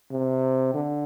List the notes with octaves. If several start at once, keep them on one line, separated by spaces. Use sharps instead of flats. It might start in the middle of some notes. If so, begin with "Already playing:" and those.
C3
D3